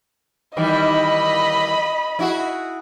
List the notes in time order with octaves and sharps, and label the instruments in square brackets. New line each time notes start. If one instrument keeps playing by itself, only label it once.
[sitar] D#3 E3 G3 [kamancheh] D#5 B5
[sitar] E4 F#4 G#4